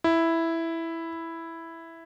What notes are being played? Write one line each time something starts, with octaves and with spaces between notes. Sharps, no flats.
E4